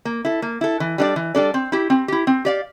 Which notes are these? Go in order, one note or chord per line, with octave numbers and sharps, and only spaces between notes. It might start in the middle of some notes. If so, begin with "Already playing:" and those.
A#3
E4 A4
A#3
E4 A4
E3
G3 D4 A4 D5
E3
G3 D4 A4 D5
C4
E4 G4
C4
E4 G4
C4
G4 D5 F5